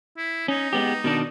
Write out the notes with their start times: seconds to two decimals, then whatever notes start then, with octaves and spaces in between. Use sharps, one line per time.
0.17 E4
0.48 C#4 D#4
0.73 G#3 B3 G4
1.04 B2 D#3 D4